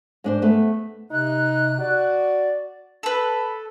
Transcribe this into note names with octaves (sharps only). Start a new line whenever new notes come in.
G#2 D4 C5
A3 B3 A4 B4
C3 D#4 F#6
F#4 D5
A4 B4